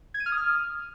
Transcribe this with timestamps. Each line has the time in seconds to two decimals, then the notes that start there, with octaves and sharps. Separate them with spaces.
0.14 G#6
0.20 D#7
0.26 F6
0.32 D#6
0.38 F6